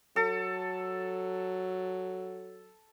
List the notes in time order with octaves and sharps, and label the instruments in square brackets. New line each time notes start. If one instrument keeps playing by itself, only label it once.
[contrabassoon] F#3 [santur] A4